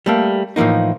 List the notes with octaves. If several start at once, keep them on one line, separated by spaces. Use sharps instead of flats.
G3 A3 A#3
A2 E3 F3 A#3 D#4